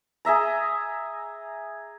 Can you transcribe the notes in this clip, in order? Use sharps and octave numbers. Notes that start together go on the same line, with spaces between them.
G#4 D#5 E5 A#5